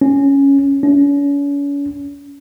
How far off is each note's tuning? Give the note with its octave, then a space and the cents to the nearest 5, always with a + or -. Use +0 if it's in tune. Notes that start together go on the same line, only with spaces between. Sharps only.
C#4 +0
C#4 +40